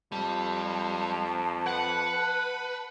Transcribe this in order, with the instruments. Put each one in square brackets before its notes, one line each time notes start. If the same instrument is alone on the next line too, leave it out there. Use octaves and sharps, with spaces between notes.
[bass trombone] F2 [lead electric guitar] G3 [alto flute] A5
[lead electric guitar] B4 [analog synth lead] F#5